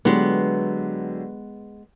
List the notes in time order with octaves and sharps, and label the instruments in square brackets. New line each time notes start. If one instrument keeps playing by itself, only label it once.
[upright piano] D3 F#3 G4 [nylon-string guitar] G#3 B3